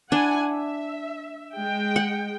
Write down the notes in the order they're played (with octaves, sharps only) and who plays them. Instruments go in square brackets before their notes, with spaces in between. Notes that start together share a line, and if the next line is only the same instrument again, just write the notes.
[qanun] D4 [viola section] E4 F#5 G#5
[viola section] E5
G#3 G5
[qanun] F#5